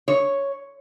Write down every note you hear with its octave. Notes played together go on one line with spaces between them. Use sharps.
C#5